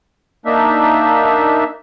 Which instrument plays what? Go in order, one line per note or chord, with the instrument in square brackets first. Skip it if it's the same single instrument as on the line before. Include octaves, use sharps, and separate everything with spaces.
[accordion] A#3 D4 D#4 E5